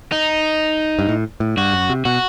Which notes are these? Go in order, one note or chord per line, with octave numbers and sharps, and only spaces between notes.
D#4
G2
A2
A2
G2 F#4
F#2
C3
B2 F#4